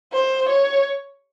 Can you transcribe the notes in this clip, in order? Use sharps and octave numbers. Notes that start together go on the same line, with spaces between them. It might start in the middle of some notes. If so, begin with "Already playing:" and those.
C5
C#5